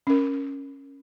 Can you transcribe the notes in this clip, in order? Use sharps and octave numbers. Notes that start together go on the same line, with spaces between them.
C#4 A#4